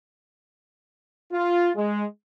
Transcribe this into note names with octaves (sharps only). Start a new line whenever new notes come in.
F4
G#3